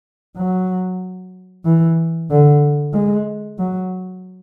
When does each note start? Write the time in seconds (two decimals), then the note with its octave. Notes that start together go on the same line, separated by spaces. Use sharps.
0.37 F#3
1.65 E3
2.30 D3
2.94 G#3
3.58 F#3